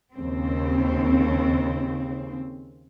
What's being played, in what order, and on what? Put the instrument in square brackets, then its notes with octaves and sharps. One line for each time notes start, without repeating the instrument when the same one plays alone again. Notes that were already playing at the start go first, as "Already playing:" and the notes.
[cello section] D#2 C#3 C4